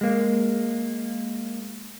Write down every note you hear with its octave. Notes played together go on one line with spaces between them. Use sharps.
G#3 A#3